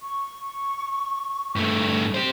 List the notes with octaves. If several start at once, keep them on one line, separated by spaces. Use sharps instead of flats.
C#6
G2 A3
G4 C5